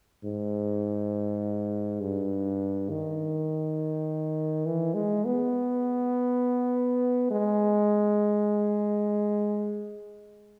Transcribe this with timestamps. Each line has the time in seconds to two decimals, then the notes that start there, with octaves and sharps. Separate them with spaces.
0.25 G#2
2.01 G2
2.89 D#3
4.66 E3
4.94 G#3
5.25 B3
7.31 G#3